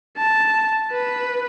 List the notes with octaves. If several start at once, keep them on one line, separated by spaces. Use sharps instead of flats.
A5
B4